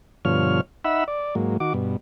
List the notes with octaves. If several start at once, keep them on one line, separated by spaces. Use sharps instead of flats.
G2 B2 D3 F3 C#5 F6
D#4 E5 F#5 B5 E6
D5
G#2 F#3 A#3
D#3 F#4 D6
G2 B2